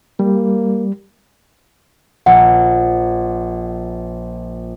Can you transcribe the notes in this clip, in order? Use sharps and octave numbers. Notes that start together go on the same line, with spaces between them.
G3 A#3
A#1 F#5